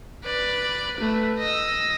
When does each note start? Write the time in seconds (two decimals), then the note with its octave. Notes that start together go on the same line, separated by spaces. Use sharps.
0.24 B4 D5
0.96 A3 B4
1.38 D#5 E6